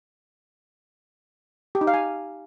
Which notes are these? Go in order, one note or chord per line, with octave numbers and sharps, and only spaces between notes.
G4
D#4
F5
G#5